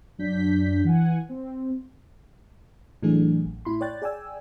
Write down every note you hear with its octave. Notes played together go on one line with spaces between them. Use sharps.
F#2 F#3 D4 G6 B6
E3 F#5 G#5
C4
A2 E3 F#3 A3 D4 G#4
A1
A2 E4 B5 C6
C#5 D5 G5 F#6 A6
G#4 D5 G5 G#5 E6